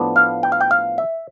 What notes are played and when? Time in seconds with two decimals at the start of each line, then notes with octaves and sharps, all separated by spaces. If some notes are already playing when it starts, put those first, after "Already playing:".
Already playing: A2 F3 B3 D4
0.16 F5
0.43 G5
0.52 F5
0.61 G5
0.71 F5
0.98 E5